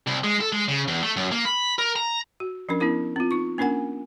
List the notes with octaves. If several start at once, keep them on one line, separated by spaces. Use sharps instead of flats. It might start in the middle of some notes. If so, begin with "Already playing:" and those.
C2
G#3
A4
G#3
C#3
E2
A3
F#2
A#3
B5
A#4
A#5
F#4
F3 C#4 D4 A#4
B3 C#4 E4 A#4
C4 F4
D#4 C#6
A#3 C#4 D4 A#4 F#5 G#5